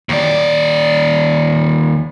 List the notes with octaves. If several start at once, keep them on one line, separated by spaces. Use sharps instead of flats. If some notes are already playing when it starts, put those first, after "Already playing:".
D#2 D5